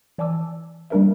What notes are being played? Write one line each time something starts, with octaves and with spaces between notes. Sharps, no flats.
E3 D5 G#5 A5 D6 E6
G3 A#3 D4 A#4 B4 E5